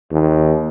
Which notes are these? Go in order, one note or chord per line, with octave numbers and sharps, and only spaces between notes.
D#2